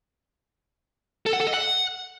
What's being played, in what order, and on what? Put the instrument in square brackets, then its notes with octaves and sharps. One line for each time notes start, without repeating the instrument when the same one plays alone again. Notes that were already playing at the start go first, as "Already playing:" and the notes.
[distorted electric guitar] A4
F#5
A4
D#5
F#5